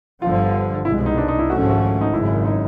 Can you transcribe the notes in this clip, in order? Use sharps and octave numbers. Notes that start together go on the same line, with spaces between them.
G1 G2 D3 F3 F4
C2 B2 G#3 E4
D#4
D4
D#4
E4
G#1 G#2 F3 A3 C#4 F#4
F#4
F#4
D#4
G#1 F#2 C#3 E4
D#4